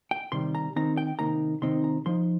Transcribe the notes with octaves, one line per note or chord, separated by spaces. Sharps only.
G5
C3 D#3 G3 C6
A#5
D#3 C4 D#4 A#5
G5
C3 D#3 A#3 D#4 A#5
C3 D#3 C4 D#4 C6
A#5
F3 D#4 C6